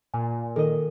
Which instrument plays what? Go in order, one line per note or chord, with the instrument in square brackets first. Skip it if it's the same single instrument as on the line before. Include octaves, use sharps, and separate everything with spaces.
[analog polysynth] A#2 [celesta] G#5
[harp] D#3 D#5 [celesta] A4 A#4